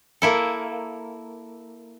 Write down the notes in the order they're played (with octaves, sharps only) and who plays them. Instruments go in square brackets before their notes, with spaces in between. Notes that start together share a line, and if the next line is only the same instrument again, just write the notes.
[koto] A#3 E4 A4